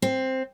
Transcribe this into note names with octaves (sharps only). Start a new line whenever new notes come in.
C4